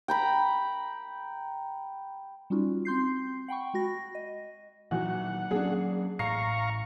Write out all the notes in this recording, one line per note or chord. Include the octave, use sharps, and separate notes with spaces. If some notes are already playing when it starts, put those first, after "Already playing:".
G5 A#5 B5
G3 C#4 D#4 F4 F#4
C4 C6 G6 C7
F#5 G5 B5 C#6
G#3 F#4 A#6
D#5
A#2 D#3 E3 F#3 F#4 F#5
F#3 A#3 C#4 D4 G#4
A1 A2 F5 A#5 C#6 C7